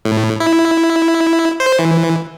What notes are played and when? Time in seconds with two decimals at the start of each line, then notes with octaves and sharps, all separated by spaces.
0.05 A2
0.40 E4
1.60 C5
1.79 E3